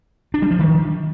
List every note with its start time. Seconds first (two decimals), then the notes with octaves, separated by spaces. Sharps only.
0.34 D4
0.42 G3
0.51 F3
0.59 D#3